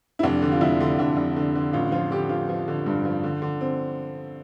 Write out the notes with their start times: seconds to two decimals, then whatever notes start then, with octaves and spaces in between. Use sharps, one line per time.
0.19 E4
0.23 F1 D4
0.42 D3
0.52 F4
0.61 F1 E4
0.80 D3
0.99 F1 D4
1.17 F1
1.36 D3
1.55 D3
1.73 A1 F4
1.92 F3 F4
2.11 D3 G4
2.29 F3 F4
2.49 F3
2.68 D3
2.86 G2
3.05 F3
3.24 D3
3.42 D3
3.61 C4